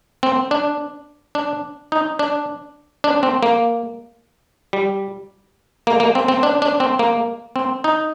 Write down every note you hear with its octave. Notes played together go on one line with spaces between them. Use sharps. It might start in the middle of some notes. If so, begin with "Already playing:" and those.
C4
D4
D4
D#4
D4
D4
C4
A#3
G3
A#3
A#3
C4
C4
D4
D4
C4
A#3
C4
D#4